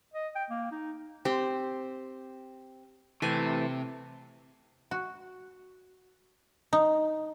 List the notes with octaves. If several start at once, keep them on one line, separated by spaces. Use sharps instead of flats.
D#5
G5
A#3
D#4
C4 G4
C3 E3 A3 C4 G#5
F#4
D#4